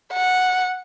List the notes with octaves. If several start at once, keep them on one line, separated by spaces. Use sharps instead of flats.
F#5